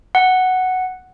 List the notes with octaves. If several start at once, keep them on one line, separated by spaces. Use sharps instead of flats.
F#5